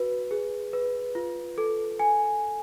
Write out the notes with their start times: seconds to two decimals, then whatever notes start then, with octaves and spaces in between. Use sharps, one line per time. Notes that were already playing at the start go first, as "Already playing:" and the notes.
Already playing: F#4 B4
0.31 G#4
0.73 B4
1.15 F4
1.58 A4
2.00 G#5